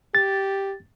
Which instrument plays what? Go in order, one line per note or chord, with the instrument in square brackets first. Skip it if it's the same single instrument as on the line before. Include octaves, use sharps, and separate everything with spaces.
[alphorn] G4 [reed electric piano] A6